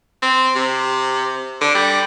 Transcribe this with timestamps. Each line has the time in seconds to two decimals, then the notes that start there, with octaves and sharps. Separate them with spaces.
0.22 C4
0.55 C3
1.61 D3
1.75 G3